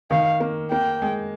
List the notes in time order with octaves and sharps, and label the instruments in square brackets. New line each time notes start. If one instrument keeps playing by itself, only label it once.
[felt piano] D#3 [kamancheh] F5
[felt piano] A#3
[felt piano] A#3 [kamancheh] G5
[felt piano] G#3